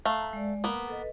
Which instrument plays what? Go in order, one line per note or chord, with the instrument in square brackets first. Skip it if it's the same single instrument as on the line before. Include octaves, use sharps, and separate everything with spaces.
[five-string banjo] A3 F5 [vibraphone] A#5
[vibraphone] G#3 D5
[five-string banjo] A#3 B3 [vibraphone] A#4
[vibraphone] A4 B4 D#5